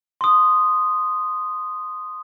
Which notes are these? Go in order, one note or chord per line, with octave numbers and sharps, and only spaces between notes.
C6 D#6